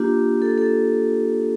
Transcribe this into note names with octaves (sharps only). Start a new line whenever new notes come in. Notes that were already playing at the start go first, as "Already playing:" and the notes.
Already playing: A#3 D4 F4 G4
A4
A4